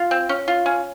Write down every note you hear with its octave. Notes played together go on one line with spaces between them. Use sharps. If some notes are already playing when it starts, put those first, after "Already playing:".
Already playing: F4
C4
C#4
F4
C#4